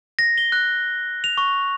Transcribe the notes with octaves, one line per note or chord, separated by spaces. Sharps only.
A#6
G7
F#6
F7
C#6